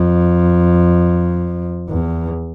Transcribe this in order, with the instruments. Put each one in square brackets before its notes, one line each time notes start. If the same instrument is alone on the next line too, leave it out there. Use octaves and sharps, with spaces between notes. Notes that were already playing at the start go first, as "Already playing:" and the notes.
Already playing: [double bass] F2
E2